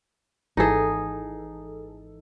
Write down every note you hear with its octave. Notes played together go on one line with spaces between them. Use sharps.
G#1 E3 D#4 G#4 A4